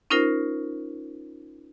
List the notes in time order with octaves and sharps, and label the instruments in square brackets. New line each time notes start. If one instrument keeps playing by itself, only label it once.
[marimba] C#4 D#4 F4 A#4 C5